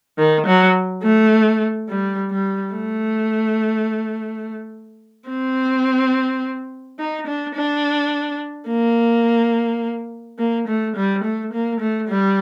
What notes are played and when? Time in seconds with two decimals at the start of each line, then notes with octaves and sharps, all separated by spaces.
0.18 D#3
0.46 F#3
1.03 A3
1.88 G3
2.31 G3
2.73 A3
5.29 C4
6.99 D#4
7.27 D4
7.55 D4
8.69 A#3
10.38 A#3
10.68 A3
10.96 G3
11.24 A3
11.53 A#3
11.80 A3
12.09 G3